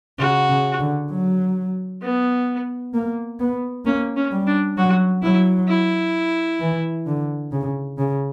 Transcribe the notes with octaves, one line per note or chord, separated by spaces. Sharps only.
C#3 F#4
C#3
D3
F#3
B3
A#3
B3
A#3 C#4
C#4
G3
D4
F#3 F#4
F#3 E4
E4
E3
D3
C#3
C#3